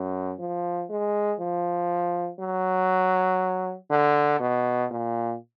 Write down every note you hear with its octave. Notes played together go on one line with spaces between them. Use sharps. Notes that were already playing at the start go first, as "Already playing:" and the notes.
Already playing: F#2
F3
G#3
F3
F#3
D3
B2
A#2